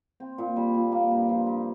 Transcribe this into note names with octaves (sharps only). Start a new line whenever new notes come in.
C4
A#2
G3
A#2
A#3
G2
F3
G2